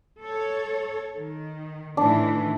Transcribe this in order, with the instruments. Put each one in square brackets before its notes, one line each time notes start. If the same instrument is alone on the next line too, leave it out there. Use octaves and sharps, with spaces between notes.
[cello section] A4 C#5
D#3
[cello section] A2 D#3 E3 [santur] D4